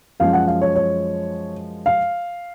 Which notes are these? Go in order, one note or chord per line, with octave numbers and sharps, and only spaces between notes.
F#2 F3 G#3 F5
F#5
F5
C#5
C#5
F5